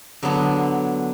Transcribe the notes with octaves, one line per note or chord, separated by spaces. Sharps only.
D3 F#3 B3 D4